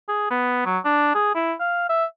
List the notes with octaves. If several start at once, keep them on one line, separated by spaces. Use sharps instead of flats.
G#4
B3
F#3
D4
G#4
E4
F5
E5